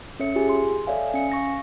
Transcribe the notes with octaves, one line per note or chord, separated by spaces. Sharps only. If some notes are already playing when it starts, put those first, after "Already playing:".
C#4 A4 C#5 E5 C#7
F4 G4 G#4 G#5
C6
A4 C#5 D5 E5 F5 G#5
C#4 G#5 C#7
F5 C#6 A#6